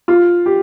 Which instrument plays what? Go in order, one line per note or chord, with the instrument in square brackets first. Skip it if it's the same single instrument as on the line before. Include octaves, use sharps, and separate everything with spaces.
[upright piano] F4
G4